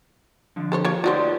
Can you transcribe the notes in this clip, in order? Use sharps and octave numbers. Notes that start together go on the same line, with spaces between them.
D3 F3
A4 C5 C#5
A#3 F4 C#5
D#4 F4 F#4 B4 C5 D5